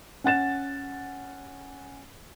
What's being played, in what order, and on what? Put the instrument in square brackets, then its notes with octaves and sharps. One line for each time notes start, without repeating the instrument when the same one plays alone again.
[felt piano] C#4 F#5 A6 E7